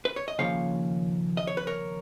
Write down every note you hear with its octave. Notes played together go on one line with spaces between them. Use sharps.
B4
C#5
D#5
D#2 C#3 F3 A#3 C#5 F5
D#5
C#5
B4
A#4 C#5